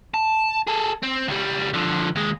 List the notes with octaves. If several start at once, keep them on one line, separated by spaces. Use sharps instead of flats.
A5
G#4 A4
C4
C#2 G3
D3 F3
D#2 G#3